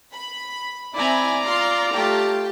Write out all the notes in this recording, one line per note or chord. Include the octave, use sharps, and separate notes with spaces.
B5
C4 E4 D5 G#5 A#5 B5
F4 C6
A3 F4 G4 A5